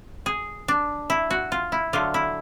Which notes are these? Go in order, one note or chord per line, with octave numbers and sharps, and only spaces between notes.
G#4
D4
E4
F#4
F4
E4
D3 F#3 A3 F4
E4